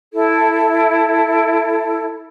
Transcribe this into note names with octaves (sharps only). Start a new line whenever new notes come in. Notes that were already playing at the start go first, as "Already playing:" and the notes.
E4 A4